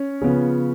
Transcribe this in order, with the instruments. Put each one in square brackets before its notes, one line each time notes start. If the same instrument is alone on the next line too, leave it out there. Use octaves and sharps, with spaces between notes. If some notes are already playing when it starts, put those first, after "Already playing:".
Already playing: [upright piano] C#4
[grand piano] C#3 F3 B3 F4